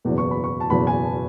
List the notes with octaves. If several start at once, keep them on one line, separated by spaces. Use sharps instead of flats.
F#1 E2 B2
C#6
B5
C#6
A5
F#1 E2 B2 B5
G#5
A5